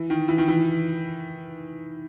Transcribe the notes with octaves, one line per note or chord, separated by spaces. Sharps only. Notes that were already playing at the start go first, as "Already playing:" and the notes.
Already playing: E3
D#3
E3
D#3
E3